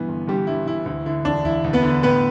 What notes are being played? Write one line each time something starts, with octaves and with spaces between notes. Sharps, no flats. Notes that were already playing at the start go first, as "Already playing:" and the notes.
Already playing: G2 E3 B3
G1
G1 G3 G4
G2 E4
E3 E4
D2 E4
D3 E4
E1 D4
E1 E4
D2
B3 B4
D3
A2 B3 B4